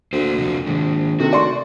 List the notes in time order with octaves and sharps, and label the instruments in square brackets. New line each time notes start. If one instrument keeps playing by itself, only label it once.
[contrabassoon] D2 [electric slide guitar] A#3 C5
[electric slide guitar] C3 F3
[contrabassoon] A#1 [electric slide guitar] D#3 G#3
[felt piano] C3 D#3 A3 [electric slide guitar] F#4
[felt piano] D5 C6 C#6